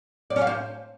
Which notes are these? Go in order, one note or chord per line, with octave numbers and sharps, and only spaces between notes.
D5
C#4
F5
C5